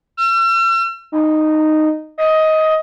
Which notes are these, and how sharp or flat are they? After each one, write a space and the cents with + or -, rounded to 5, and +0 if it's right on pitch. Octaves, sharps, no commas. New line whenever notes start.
E6 +45
D#4 -10
D#5 +15